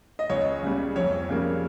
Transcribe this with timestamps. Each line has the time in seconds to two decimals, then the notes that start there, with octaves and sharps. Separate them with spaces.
0.19 D#5
0.29 C#2 C#5
0.63 C#3 G3
0.96 F2 C#5
1.29 C#3 G3 A#3